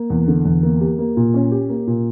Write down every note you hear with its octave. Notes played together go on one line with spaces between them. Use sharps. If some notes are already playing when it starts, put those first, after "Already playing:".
Already playing: A#3
E2
D3
E2
A#3
G4
A#3
A#2
C#4
G4
A#3
A#2